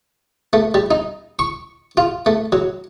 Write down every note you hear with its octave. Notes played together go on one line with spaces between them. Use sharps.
A3
G3
D#4
C#6
F4
A3
F#3